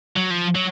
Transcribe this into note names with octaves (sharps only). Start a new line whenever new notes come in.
F#3
F3
F#3